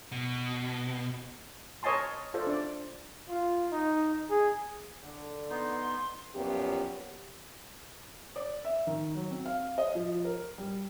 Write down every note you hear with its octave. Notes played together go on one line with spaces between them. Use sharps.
B2
A#4 C#5 D#5 G#5 A5 C6
F4 A4 C5 D5
D4 D5
F4
D#4
G#4
D3
B3 D#4 C6
F#2 A#2 F3 B3 C#4 G4
D5
E5
D#3
F#3
C4
F5
D#5
F3
A#4
G3